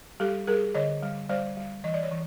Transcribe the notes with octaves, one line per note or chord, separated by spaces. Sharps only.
G3 G4 A4
G3 G#4 A#4
D3 C#5 D#5
G3
G3 C5 D5
G3
E3 D#5
D5
C#5
E3